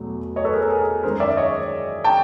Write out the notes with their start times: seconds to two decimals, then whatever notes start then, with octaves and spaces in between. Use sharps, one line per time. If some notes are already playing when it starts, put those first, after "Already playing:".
Already playing: E2 B2 F#3 A3
0.36 C#5 D#5
0.45 A4 B4
0.53 G#4 A#4
0.62 A4
0.70 G#4 A#4
1.03 F#2 D#3 G#3 A#4 C5
1.20 D5 E5
1.37 C#5 D#5
2.04 G5 A5